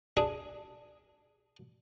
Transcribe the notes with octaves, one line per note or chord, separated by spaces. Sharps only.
D4 G#4